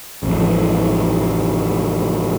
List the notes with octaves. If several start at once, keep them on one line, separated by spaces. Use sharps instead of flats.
A1 F2